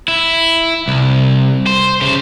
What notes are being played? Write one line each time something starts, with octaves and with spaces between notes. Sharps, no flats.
E4
C2
C5
C#3 C5